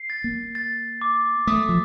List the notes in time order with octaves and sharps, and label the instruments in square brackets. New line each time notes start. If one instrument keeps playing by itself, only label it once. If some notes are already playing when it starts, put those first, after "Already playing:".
Already playing: [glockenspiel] C7
A6
[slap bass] A#3
[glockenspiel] A6
D6
[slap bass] A3 [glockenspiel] D#6
[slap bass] F3